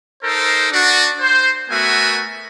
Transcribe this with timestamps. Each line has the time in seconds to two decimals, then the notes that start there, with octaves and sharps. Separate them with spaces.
0.24 D#4 A4 A#4 C5
0.72 D4 F#4
1.20 C5
1.71 A3 B3 F#4 A#4 E5 G#5